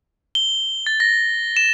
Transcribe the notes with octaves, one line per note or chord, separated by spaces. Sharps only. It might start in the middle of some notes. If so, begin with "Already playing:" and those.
G7
A6
A#6
E7